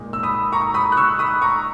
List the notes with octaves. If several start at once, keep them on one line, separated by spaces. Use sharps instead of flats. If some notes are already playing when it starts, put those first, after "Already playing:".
Already playing: A#2 G#3 D#4
E6
B5 D#6
A#5 C#6
B5 D#6
F#6
C#6 E6
B5 D#6
A#5 C#6